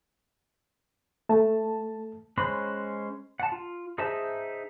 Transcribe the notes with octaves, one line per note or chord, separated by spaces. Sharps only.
A3 A5
G#3 C#4 C5 B5 F#6
F#5 A5
F4
D#4 G#4 C5 E5 A5